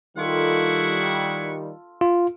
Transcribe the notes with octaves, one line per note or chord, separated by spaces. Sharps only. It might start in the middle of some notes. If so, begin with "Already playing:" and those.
D#3 G3 E4 F4 A4 F#5 C#6
F4